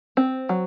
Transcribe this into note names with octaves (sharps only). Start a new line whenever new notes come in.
C4
F#3